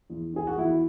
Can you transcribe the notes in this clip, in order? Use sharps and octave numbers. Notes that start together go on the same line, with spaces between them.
E2
D#3 G#4
F#4
E2 E4